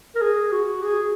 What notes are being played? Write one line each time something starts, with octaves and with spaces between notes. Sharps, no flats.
A#4
G#4
F#4
G#4